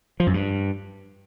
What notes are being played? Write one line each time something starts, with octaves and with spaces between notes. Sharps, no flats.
F3
F#2
G2